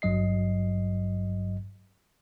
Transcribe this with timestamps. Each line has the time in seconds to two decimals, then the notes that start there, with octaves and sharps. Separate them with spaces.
0.02 G#1 G2 F#3 D#5 C7